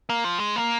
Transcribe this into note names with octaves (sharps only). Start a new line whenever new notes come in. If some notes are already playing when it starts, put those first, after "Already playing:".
A#3
F3
G#3
A#3